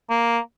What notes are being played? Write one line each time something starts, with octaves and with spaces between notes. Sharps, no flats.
A#3